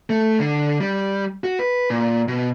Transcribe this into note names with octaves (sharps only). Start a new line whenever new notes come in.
A3
D3
G3
F#4
B4
A#2
B2